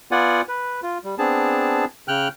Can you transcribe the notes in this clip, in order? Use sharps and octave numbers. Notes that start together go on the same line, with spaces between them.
B3 F4 D5 F#5 G#5
B4
F4
G3
B3 C4 D4 G#4 A5
C#3 G5 F6 F#6